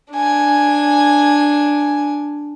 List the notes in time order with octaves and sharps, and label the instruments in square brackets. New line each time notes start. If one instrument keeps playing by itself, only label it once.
[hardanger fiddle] D4 G#5